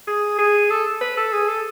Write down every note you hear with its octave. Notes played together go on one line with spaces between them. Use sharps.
G#4
G#4
A4
B4
A4
G#4
A4